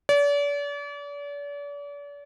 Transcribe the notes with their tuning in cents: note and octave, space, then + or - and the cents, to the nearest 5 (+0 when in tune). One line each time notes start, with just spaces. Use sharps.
D5 -40